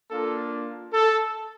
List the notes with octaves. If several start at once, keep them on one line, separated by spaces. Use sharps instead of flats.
A#3 D4 F4 A4
A4